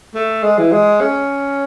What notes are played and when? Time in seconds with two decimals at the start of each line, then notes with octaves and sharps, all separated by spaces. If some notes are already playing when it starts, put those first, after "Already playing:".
0.14 A3
0.43 G#3
0.58 E3
0.72 G#3
1.01 C#4